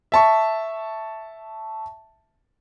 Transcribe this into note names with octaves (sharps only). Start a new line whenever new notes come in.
E5 A5 C#6